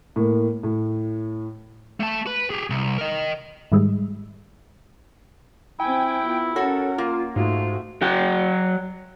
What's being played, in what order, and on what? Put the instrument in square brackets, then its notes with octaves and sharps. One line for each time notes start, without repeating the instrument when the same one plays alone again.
[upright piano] A2 A#3
A2
[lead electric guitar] A3 A5
B4
G4 G#4
C2
A#4 D#5
[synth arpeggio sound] G#2 D#3 G3 G#3
[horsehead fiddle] C4 G#5 [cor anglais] E4 [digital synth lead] G5
[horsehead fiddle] B3 F4
[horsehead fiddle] C#4 A#4 [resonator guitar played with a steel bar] F#4 C#5 [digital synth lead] A4
[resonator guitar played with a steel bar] A#3 [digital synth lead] F4
[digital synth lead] G#2 [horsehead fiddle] A3 F#4 [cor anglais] F4
[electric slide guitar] F#3 F#4 G5